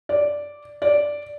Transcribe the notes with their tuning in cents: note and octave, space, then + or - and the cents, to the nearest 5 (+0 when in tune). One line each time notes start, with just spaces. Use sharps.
D5 -5
D5 -5